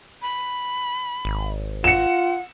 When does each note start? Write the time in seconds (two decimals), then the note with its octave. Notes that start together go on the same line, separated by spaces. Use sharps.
0.22 B5
1.25 G#1
1.84 F4 F#5 C#7 E7